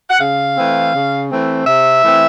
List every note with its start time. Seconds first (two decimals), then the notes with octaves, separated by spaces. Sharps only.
0.10 F#5
0.20 C#3 F5
0.56 E3 A3 C4
0.93 C#3
1.30 E3 A3 C4
1.66 C3 E5
2.03 E3 A3 C4